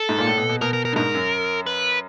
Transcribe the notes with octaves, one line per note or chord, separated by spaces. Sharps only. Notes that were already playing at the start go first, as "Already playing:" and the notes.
Already playing: A4
G#2
A#2
A2
B2
B2
B2 A#4
A#4
A#4
G2
G#2 A#4
F#2
B4